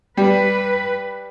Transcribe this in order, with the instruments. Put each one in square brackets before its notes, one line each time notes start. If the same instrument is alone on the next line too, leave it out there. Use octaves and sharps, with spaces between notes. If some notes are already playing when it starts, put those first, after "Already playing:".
[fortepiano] G3 [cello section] B4